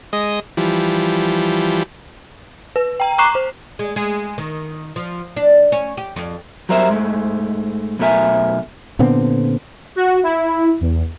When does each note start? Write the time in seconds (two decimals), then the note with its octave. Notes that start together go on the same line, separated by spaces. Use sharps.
0.13 G#3 D#5
0.57 E3 F3 G3
2.76 B4
3.00 G5 A#5
3.18 A#5 C#6 D6 F#6 C7 E7
3.35 C5
3.79 G#3
3.96 G#3
4.38 D#3
4.96 F3
5.36 D4
5.72 C#4
5.97 G4
6.16 F2
6.69 F#3 G3 A#4 C5 E5
6.89 G#2 G#3 A3
7.99 B1 B2 A3 A#4 E5 G#5
8.99 A#2 D3 B3 C4
9.96 F#4
10.23 E4
10.81 E2